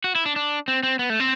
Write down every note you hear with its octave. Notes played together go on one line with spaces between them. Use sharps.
F#4
E4
D4
D4
C4
C4
B3
A3
C4